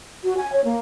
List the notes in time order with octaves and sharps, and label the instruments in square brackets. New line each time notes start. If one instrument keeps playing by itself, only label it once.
[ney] F#4
G#5
C#5
A#3